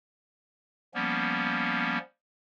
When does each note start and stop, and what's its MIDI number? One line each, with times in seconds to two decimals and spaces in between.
0.94 1.98 53
0.94 1.98 55
0.94 1.98 58
0.94 1.98 59
0.94 1.98 61